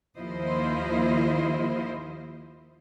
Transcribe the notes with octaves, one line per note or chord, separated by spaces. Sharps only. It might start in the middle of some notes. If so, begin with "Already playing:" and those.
D#2 F3 E4 F4 C5 D#5